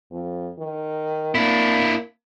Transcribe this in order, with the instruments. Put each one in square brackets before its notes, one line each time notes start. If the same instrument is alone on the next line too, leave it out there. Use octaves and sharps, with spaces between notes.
[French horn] F2
D#3
[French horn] A#3 [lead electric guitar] D4 E4